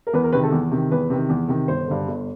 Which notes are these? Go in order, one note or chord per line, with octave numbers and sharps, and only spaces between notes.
A#4
E2 B4
A#4
C3 D#3 B4
A4
E2
C3 D#3
E2 B4
C3 D#3
E2
C3 D#3
G1 C5
G2 D3
G1